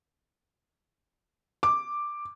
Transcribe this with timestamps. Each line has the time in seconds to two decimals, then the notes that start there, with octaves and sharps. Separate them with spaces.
1.63 D6